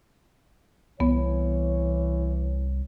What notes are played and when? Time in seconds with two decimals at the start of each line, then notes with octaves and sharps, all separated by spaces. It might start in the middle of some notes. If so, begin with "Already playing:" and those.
1.00 C2 E3 B3 C#5